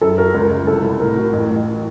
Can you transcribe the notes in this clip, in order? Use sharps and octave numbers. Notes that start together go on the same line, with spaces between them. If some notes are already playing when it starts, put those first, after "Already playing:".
F#2 A4
F#4 A#4
C#2
C#2
C2 A4
C2
A2 A#4
F#4
A1
A1